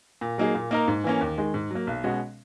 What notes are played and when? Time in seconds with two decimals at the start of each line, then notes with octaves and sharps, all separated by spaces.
0.21 A#2
0.38 F#3 A#3 D#4 G#4
0.55 A#2
0.71 A#3 D#4 A#4
0.88 G#2
1.04 E3 A#3 C#4
1.21 D#2
1.38 D#3 G#3
1.54 G#2
1.71 F#3 A#3
1.87 B1
2.03 B2 G#3 C#4 F#4